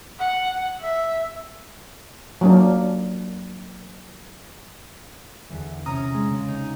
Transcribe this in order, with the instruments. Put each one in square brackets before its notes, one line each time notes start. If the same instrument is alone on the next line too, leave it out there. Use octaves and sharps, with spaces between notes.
[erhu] F#5
E5
[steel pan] F#3 A#3 D4
[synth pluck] E2 D3 E3
C3 C#4 A#5 D#6
G#3
C#3
C#3 D#4